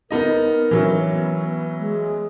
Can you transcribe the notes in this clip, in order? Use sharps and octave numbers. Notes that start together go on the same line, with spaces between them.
B3 D#4 A#4 D#5
E3 F#3 C#4
B3
B3
G#3